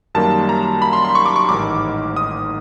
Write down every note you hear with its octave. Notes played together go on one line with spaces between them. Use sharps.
F#2 D#3 G3 A#3 A5
A#5
B5
C6
C6
C#6
D6
C#6
A1 G#2 D#3 D6
D#6